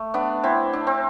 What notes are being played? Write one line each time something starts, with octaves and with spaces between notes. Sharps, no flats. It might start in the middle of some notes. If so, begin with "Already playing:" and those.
Already playing: A3
B3 D4
C4 E4
D4
C4